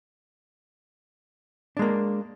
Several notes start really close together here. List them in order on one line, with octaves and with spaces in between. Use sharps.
D4 G#3 A#3